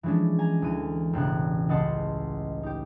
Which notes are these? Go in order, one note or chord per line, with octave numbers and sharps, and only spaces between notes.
E3 F3 G#3 C#4 D4
G#5 A#5
D2 E3 D#7
E1 A1 C#3 F#6
C#2 D#5 F#5 A5 C6 C7
D#4 G4